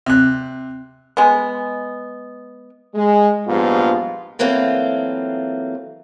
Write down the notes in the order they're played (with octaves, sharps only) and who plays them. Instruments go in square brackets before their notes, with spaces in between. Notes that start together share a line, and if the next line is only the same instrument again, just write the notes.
[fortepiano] C3 F#6
[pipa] G#3 B3
[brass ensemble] G#3
A#1 G#2 F3 G3 B3 F4
[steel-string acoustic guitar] E3 F#3 A3 A#3 C4 F4